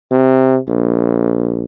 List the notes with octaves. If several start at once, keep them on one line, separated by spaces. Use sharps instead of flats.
C3
A#1